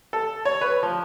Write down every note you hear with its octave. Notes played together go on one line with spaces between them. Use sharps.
A4
C#5
B4
F3